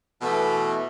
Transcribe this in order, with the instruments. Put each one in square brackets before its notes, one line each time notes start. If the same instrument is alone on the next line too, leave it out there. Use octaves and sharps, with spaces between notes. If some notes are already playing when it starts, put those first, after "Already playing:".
[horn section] B2 E3 A3